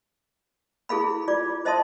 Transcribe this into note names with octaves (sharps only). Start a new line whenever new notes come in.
E4 G#4 A4 F5 B5
F4 D5 D6
C5 D#5 E5 A5 C6 D#6